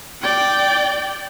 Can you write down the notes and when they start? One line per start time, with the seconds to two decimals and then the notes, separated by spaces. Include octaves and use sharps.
0.22 D5 G5